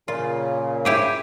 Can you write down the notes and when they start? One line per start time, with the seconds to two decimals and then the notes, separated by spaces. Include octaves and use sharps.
0.08 A#2 C#3 F4
0.85 E4 G4 G#4